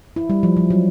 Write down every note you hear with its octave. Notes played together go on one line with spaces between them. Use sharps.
E4
G3
F3
F3
F#3